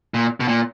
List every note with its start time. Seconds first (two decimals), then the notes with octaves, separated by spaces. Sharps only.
0.14 A#2
0.40 B2
0.48 A#2